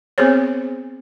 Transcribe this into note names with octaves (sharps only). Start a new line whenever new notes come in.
B3 C4 G#4 C5 C#5